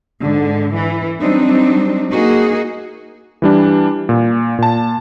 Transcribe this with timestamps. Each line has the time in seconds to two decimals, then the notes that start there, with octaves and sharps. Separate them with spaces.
0.20 G#2 D3
0.73 E3
1.19 F#3 G3 C4 D4 D#4
2.10 A#3 D#4 F#4 G#4
3.42 E3 G3 D4
4.09 A#2
4.59 A#2 A5